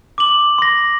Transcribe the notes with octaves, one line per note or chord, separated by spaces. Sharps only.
D6 F#7
C6 A#6